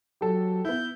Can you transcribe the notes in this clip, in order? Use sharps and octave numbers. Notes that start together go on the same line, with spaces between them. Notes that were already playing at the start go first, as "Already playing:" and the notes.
F#3 G4 A4
B3 E4 G6